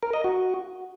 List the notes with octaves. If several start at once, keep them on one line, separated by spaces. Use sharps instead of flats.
A#4
D#5
F#4